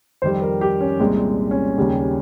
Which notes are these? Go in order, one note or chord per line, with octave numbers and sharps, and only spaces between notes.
F2 D#3 G3 C5
A#4
G4
C#4
C2 A#2 G#3 C4
C#4
D#2 C#3 G3